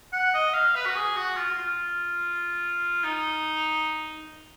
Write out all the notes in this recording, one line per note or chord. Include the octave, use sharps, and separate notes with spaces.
F#5
D#5
F5
B4
F#4
G#4
F#4
F4
F4
D#4